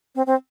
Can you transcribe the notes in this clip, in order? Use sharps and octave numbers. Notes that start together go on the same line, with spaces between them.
C4
C4